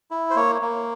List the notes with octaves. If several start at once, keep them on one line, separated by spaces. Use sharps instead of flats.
E4
C5
A#3 C#5
A#3